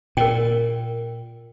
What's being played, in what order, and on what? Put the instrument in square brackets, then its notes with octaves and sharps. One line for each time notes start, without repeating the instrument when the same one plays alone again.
[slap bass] A#2 [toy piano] A#4 G5